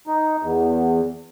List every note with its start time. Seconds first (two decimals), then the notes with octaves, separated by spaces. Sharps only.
0.07 D#4
0.42 E2